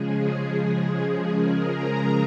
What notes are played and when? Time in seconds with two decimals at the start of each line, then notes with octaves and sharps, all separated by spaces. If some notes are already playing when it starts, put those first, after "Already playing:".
Already playing: C#3 F3 G#3 G#4
1.32 A#4
1.70 A#5